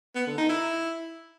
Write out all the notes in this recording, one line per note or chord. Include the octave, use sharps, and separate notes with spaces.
B3
D3
D#4
E4